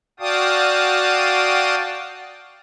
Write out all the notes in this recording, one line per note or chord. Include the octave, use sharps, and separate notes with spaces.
F#4 D5 F5 G5 A5 D#6